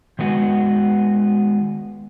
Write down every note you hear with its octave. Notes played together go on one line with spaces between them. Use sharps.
D#3 G#3 B3 F#4